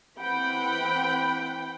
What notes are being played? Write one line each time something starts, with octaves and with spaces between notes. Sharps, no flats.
E3 C4 F#5 G5 B5